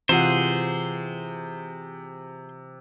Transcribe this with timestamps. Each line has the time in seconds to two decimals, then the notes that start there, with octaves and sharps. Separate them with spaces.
0.09 C3 E3 F4 G#4 C5 F#5